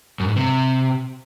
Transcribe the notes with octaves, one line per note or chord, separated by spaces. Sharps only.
F#2
G#2
C3